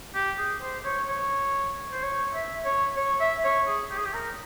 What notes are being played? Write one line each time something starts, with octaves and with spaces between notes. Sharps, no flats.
G4
G#4
C5
C#5
C#5
C5
C#5
E5
C#5
C#5
E5
C#5
G#4
G4
G#4
G4
A#4